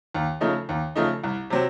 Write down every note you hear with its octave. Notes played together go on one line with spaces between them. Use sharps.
D#2
C#3 F3 A3 D#4
D#2
C#3 F3 A3 D#4
C2
C3 F#3 C4